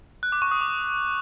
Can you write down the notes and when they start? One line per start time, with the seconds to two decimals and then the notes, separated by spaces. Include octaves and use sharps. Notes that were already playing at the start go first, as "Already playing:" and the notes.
0.23 F#6
0.32 D6
0.42 C#6
0.51 D#6
0.61 D6